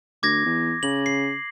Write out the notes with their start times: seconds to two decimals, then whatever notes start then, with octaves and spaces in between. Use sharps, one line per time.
0.23 D2 D6 G#6 A#6
0.46 E2
0.83 C#3 F#7
1.06 C7